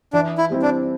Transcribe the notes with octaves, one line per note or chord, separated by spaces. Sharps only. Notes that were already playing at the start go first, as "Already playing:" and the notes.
E3 D4
E4
G3 C4 E4
D4